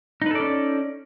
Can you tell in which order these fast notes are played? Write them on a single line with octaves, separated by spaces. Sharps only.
D#4 B4 A4 D5 C#4